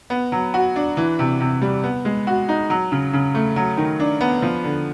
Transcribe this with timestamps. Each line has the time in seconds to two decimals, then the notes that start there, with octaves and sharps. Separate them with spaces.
0.10 B3
0.32 F#3
0.54 F#4
0.76 D4
0.97 E3
1.19 C3
1.41 C3
1.61 G3
1.84 B3
2.05 G#3
2.27 F#4
2.49 D#4
2.70 F#3
2.92 C#3
3.13 C#3
3.35 A3
3.56 F#3
3.77 D#3
4.00 D4
4.21 B3
4.42 F3
4.64 D3